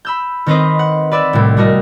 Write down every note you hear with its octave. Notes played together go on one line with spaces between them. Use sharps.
B5 E6 G6
D#3 C4 D#4 B4 C5 D#5
F#5
B4 D5 E5
C2 A2
G3 A3 F#4 A#4 D#5